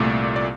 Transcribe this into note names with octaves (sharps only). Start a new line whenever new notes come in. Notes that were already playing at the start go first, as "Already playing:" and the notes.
Already playing: C2 A#2 A3 D5
D5